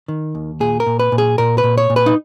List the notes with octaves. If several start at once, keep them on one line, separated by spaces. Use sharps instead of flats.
D#3
D#2
A#2 G#4
A#4
A#2
B4
A#2
G#4
A#2 A#4
B4
A#2
C#5
A#2
B4
D#4